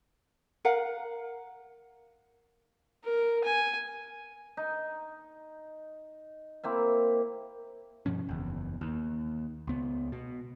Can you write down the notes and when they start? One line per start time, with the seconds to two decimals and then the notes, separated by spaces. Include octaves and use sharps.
0.65 A#4 F5 F#5
3.04 A#4
3.44 G#5
4.57 D#4
6.64 A#3 C4 E4
8.06 G2 B2 F3 C#4
8.29 F#1 E2
8.81 D#2
9.67 C#2 B3
10.12 B2